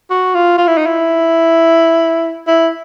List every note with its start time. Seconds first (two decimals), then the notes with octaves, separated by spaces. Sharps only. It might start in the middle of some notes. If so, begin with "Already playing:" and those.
0.11 F#4
0.35 F4
0.58 F4
0.67 E4
0.77 D#4
0.86 E4
2.47 E4